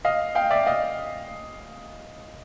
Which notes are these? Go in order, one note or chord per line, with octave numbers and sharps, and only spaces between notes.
D#5 F5
F5 G5
D5 E5
D#5 F5